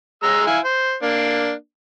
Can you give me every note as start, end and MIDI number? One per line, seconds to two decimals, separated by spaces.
0.23 0.44 56
0.23 0.44 82
0.23 0.44 88
0.47 0.58 64
0.47 0.58 77
0.47 0.58 80
0.64 0.94 72
1.02 1.52 58
1.02 1.52 62